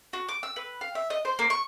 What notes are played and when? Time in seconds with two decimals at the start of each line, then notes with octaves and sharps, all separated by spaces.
0.13 F#4
0.29 D6
0.43 E6
0.56 B4
0.81 F5
0.95 E5
1.10 D#5
1.25 C5
1.39 A#3
1.50 C#6